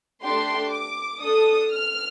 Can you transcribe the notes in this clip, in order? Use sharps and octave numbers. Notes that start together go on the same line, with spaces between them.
A3 D4 G4 C6
D6
D4 A4 D#6
F6